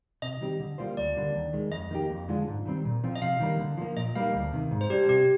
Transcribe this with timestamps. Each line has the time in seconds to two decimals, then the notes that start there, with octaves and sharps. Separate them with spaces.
0.22 C3 D#5
0.41 D#3 G3 C4 G4
0.60 D3
0.78 G3 A#3 F4 C5
0.97 D2 D5
1.16 D3 G3 A#3
1.35 D#2
1.53 D#3 G#3
1.72 F2 D#5
1.91 D#3 A#3 D#4 G4
2.10 F2
2.28 D3 G#3 D4 F4
2.48 G#2
2.65 D#3 G3 C4
2.85 A#2
3.04 F3 C4 F4
3.15 D#5
3.22 C3 F5
3.40 D#3 G3 A#3
3.59 D3
3.77 F3 A#3
3.97 A#2 D#5
4.15 G3 A#3 D#4 F5
4.34 D2
4.53 C3 D#3
4.71 G#2
4.81 C5
4.90 G3 D4 G4
5.08 C3 G4